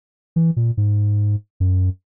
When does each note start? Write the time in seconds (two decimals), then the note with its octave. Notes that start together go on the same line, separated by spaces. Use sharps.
0.36 E3
0.56 A#2
0.77 G#2
1.60 F#2